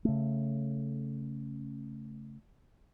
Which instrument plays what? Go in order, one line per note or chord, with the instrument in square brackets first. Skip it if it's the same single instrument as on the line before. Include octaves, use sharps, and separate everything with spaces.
[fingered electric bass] C#3 A3